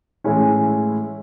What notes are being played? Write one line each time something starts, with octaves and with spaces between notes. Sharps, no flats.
A2 E3 G#3 C#4 E4